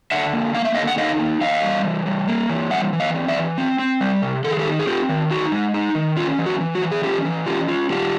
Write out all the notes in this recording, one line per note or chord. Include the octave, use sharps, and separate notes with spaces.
D3 E5 F#5
A#3
A#3 F5
E5
D3 D#5 F5
F#5
D#4 D#5 F5
A#3
E3 D#5 F5
G3
E3
G3
A#3
E3
G3 E5 F#5
E3
D#5 F5
C4
D5 E5
E3
C4
C4
G3
C3
D#3 A4
G#4
G4 A4
D#4
G#4
C4 F4 G4
D#3
D#4 F#4
G#3
D#4
D#3
C#4 F4
E3
F#4
E3
F#4
E3
G#4
C#4 F4 G4
E3
C#4 F4 G4
F4
D3 F4 G4